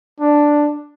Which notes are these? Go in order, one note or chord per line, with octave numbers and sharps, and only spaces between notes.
D4